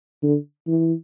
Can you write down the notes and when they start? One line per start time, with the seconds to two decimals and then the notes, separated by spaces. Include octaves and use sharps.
0.23 D3
0.67 E3